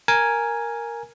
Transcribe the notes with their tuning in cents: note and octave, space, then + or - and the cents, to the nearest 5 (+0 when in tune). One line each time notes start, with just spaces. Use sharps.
A#4 +0 G#5 +0